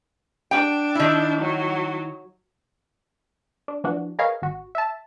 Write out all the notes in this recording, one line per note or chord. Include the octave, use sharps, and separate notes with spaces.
D4 G5
D#3 E4
F#3
D4
E3 F3 D4 F#4
G#4 A#4 B4 C#5 D#5 F5
G#1 F#4
E5 A5